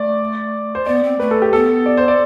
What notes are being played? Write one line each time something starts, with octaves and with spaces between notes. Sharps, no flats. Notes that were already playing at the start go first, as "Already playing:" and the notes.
Already playing: A3 D5
C5
B3 D5
C4
A3 B4
A4
G4
B3 A4
D5
C5
D5